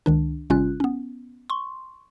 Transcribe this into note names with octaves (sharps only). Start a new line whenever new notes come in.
C#2 D#3 D4
G#1 C3 G3 C#4 F4 F#6
B3 C#4
C6 C#6